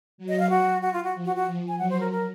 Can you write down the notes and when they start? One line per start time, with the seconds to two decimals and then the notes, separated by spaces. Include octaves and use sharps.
0.18 F#3
0.29 D#5
0.39 F5
0.50 F#4
0.82 F#4
0.93 F4
1.04 F#4
1.15 F3
1.25 F#4
1.36 F#4
1.47 F3
1.68 G#5
1.78 F#3 F#5
1.90 C5
2.00 A#4
2.11 A#4